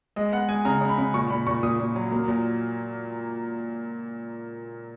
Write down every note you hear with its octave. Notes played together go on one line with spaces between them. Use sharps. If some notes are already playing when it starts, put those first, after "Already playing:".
G#3 D#5
B3 F#5
G#3 G#5
C#3 A#5
C#3
B5
C#3
A#2 C#6
A#2 B5
A#2 C#6
A#2 D#6
A#2
F#3
A#3
A#2